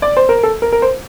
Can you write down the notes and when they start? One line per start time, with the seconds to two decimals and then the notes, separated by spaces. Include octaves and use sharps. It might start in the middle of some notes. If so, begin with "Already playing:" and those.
0.02 D5
0.17 C5
0.29 A#4
0.43 A4
0.62 A#4
0.72 A#4
0.82 C5